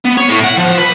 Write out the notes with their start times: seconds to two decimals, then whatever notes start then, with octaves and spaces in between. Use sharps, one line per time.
0.05 B3
0.17 C#5
0.29 A2
0.44 F#5
0.58 F3
0.78 B4